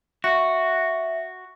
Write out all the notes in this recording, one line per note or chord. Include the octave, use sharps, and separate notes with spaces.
F#4 E5